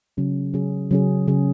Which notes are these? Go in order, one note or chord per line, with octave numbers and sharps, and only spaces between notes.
C#3 F#3 C#4 G#4
C#3 F#3 C#4 G#4
C#3 F#3 C#4 G#4
C#3 F#3 C#4 G#4